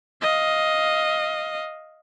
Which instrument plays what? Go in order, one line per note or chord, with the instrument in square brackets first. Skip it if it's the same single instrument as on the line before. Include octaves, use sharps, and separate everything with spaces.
[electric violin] D#5 F5